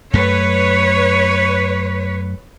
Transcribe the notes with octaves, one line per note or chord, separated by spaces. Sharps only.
F#2 A3 B4 C#5